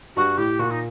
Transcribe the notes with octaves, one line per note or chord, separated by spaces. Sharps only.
G2 F#4
A2 G4
A#2 F#4
D#4